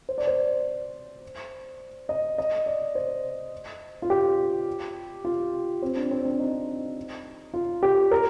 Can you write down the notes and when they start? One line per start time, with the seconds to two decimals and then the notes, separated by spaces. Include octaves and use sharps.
0.09 C5
0.18 D5
0.27 C5
2.09 D#5
2.38 D#5
2.66 D5
2.95 C5
4.02 F4
4.10 G4
5.25 F4
5.82 C4
5.97 D4
6.11 C4
6.25 D4
6.40 D#4
7.54 F4
7.83 G4
8.11 A#4